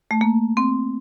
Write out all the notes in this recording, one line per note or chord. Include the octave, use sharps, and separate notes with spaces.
A3
A#3
C4